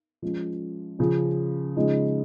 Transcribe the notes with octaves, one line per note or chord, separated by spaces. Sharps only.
F3 G#3 C#4
C#3 F3 C#4
C#3 F3 G#3 D#4